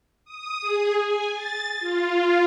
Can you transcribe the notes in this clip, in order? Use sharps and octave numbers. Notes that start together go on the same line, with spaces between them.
D#6
G#4
G#5
A6
F4